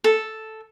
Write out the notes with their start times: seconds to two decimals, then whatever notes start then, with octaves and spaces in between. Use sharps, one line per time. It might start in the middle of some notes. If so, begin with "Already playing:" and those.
0.04 A4